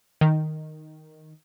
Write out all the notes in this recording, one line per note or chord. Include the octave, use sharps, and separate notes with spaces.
D#3